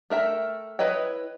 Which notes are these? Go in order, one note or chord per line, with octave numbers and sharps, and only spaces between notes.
A3 A#4 E5 G5
E4 B4 C#5 D#5 G5